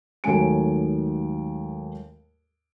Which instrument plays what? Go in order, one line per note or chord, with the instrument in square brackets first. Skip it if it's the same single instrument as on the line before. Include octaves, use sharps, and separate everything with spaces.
[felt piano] D#2 G#2 F#3 A3 G#5 D7